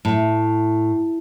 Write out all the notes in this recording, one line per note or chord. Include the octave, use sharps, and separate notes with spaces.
A2